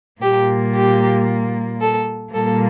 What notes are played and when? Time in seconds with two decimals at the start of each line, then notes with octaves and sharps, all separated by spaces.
0.21 A#2 G3 A#3 G4
0.74 G4
1.81 A4
2.33 A#2 G3 A#3 A4